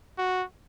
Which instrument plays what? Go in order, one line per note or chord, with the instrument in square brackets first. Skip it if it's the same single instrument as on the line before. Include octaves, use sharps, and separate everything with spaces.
[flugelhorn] F#4